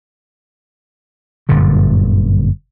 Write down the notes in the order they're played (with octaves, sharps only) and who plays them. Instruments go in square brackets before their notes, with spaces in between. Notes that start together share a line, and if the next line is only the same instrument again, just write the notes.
[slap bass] G1 F#2 A#2 D3